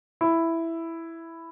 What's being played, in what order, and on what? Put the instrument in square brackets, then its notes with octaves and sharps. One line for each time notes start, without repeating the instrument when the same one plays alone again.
[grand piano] E4